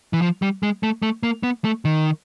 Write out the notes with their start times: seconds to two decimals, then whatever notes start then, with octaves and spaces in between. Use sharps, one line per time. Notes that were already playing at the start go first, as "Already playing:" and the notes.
0.13 E3
0.22 F3
0.42 G3
0.63 G#3
0.83 A3
1.02 A3
1.23 A#3
1.43 B3
1.64 A3
1.85 D#3